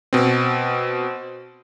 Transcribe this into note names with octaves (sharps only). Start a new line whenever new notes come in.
B2 C4